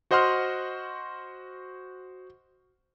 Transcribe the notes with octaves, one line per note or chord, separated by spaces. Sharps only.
F#4 C5 D#5 F#5 C6 F6